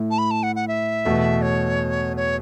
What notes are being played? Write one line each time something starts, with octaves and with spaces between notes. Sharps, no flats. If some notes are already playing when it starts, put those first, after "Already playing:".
Already playing: A2 A3 E4
A5
B5
A5
F#5
F#5
E5
E2 B2 A3
C#5
C#5